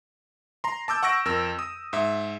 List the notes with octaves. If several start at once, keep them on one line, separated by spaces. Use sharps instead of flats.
A#5 C6
A5 D6 E6 G6
F#5 C#6 E6 A#6 D7
F2 A#4 E6
D#6
G#2 E5